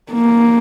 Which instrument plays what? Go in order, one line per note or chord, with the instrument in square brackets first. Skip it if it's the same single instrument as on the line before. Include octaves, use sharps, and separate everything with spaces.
[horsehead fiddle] A#3